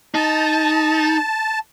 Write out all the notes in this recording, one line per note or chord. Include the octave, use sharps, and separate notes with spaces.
D#4 A5